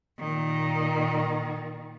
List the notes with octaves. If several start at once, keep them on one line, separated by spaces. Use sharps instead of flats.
A#2 D#3